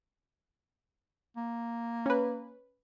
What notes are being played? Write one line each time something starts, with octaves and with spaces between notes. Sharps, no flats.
A#3
C#4 B4